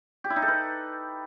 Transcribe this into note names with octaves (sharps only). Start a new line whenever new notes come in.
G4
E4
D#4
A4
B4